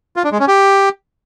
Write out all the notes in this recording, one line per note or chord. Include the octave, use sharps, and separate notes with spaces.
F4
D4
G#3
C#4
G4